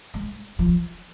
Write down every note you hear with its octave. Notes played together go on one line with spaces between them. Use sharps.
G#3
F3